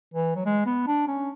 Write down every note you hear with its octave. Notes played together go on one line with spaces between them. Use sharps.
E3
F#3
G#3
B3
D4
C#4